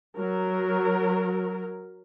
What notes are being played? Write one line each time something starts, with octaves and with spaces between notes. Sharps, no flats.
F#3 A#4